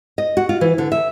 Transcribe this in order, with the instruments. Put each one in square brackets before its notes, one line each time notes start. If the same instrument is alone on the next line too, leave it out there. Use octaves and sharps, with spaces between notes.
[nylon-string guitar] D#5
F#4
F4
E3
D3
E5